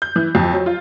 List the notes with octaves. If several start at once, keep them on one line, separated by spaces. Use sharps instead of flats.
G6
E3
F2
F#3
F4